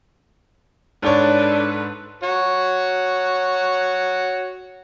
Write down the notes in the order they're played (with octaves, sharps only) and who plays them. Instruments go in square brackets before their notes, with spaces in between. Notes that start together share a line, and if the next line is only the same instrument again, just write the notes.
[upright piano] G#2 C#5 [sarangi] D4 [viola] A4 B4
[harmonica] F#4 C#5